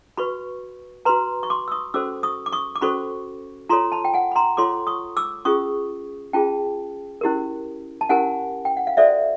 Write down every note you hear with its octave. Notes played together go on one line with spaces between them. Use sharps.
F#4 B4 B5 C#6
F#4 B4 A#5 C6
C#6
C6 D6
E6
C#6 D#6
C#4 F#4 A4 C5 D6 E6
C#6 D#6
D6
C#6 D#6
D6
C#4 F#4 A4 C5 B5 C#6
F4 A4 C#5 A#5 C6
A5 B5
G5
F#5 G#5
B5
A#5 C6
F4 A4 C#5 C6 D6
C#6 D#6
D6 E6
C#4 F4 G#4 C#6 D#6
C#4 F4 G#4 G5 A5
C#4 E4 G4 A#4
A5
C#4 E4 G4 A#4 F#5 G#5
G5
F#5
F5
F#4 A4 C5 D5 E5